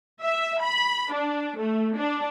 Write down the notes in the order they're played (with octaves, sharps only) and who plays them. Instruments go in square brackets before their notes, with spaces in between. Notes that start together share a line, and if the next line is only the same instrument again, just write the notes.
[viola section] E5
B5
D4
A3
D4